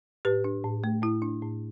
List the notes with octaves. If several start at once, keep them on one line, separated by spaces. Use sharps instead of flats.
A2 G4 B4
D4
A2
A3
A2 E4
D4
A2